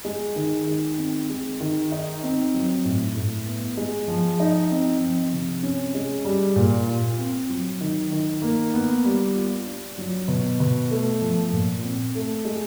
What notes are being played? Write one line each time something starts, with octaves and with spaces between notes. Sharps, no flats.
G#3
D#3
D#3
C4
G#3
D#3
D#4
C4
F#3
A2
A2
B3
G#3
F3
D#4
C4
F3
C3
C#4
G#3
G3
A#2
F4
C4
F#3
D#3
D#3
A#3
B3
G3
F4
D4
F#3
B2
B2
A3
F3
A#2
C4
A3
G#3